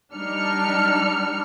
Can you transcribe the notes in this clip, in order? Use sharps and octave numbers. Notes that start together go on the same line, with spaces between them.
G3 D4 D#4 F6 C#7